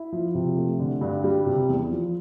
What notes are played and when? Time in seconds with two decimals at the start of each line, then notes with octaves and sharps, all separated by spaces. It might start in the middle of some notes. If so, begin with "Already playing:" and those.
Already playing: E4
0.13 F3
0.35 C3
0.57 A3
0.79 D3
1.01 G2
1.24 G3
1.46 C3
1.69 E2
1.91 F3